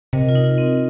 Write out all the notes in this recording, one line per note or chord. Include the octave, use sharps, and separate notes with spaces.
C3 A#4 D#5
F4 A#4
D#4
F4
C4